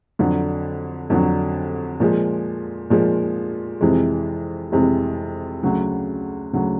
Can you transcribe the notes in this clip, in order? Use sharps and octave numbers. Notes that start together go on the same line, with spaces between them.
F2 D3 F#3
F2 D3 F#3
A#2 F3 G#3
A#2 F3 G#3
F2 C3 E3 G#3
F2 C3 E3 G#3
D2 C#3 F#3
D2 C#3 F#3